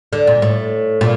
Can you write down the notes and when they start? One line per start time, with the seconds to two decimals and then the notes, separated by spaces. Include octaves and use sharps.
0.13 D3
0.27 A#2
0.42 A2
1.01 A#2